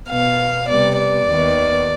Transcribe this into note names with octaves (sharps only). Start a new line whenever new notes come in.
B2 B3 F5
C3 G3 B3 D5
D5
D#2 D#3 B3